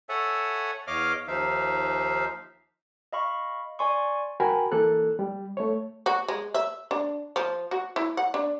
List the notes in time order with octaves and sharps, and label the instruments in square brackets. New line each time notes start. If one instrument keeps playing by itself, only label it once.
[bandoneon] A4 C#5 E5 F#5 G#5
E2 C#5 D#5 F5 D6 F6
D#2 F3 D#4 E5 F5
[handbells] D#5 F5 B5 C#6
D5 G#5 C6 C#6
[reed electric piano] F#4 A#4 G5 G#5 B5
E3 A#3 A4 F#6
G3
A3 C#5
[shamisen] F#4
G#3
E5
D4
F3
F#4
E4
F#5
D4